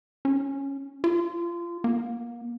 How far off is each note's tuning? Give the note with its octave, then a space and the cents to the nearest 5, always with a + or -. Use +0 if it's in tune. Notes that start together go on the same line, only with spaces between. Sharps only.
C#4 -5
F4 -25
A#3 +30